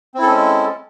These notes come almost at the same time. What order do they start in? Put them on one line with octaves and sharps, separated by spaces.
C4 E4 A4 C#4 G#3